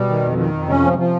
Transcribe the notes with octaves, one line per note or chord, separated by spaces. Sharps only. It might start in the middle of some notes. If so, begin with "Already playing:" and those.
Already playing: B2 G3
D#3
F2
D#3
F2
C3 C#4
F3
F3